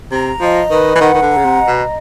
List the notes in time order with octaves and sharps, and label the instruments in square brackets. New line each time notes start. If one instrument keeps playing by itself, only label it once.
[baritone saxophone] C3 [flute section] A#5
[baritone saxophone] F3 [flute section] D#5
[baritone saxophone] D#3 [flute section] B4
[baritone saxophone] E3
[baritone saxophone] D#3 [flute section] F#5
[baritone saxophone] D#3
D3
[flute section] A#5
[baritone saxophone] C#3
C3
[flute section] D#5
[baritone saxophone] B2